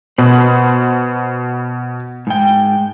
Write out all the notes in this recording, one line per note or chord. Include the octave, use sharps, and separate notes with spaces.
B2 B4 C5
G#2 G5